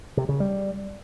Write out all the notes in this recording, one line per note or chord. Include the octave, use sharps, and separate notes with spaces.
C3
C#3
G3